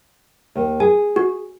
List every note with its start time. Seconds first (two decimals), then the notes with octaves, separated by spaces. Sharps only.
0.55 D#2
0.80 G#4 G#5
1.16 F#4